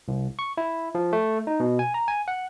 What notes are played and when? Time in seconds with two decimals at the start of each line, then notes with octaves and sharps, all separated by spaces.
0.08 C2
0.39 C#6
0.57 E4
0.95 F3
1.13 A3
1.47 D#4
1.60 B2
1.79 G#5
1.94 A#5
2.08 G#5
2.28 F#5